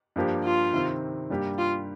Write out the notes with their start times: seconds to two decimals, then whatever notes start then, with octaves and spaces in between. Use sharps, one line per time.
0.16 G2 F3 A#3 G4
0.44 F4
0.73 C3 D#3 C4
1.30 G2 G3 A#3 G4
1.58 F4